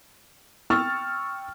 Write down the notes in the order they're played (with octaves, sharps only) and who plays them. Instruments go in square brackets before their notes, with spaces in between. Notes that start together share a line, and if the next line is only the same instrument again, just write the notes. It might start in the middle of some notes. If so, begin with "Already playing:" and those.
[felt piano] G5 C#6 E6 F6 A6